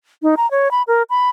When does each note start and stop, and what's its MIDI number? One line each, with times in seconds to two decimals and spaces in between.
0.23 0.35 63
0.37 0.49 82
0.51 0.71 73
0.71 0.82 83
0.88 1.03 70
1.10 1.30 83